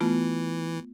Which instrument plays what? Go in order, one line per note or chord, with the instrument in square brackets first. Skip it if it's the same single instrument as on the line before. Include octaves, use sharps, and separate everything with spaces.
[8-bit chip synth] E3 [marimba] A3 B3 F4